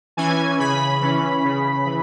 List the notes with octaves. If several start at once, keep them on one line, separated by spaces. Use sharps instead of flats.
E3 C#4 G#5
C#3 B5
E3 C#4
C#3
E3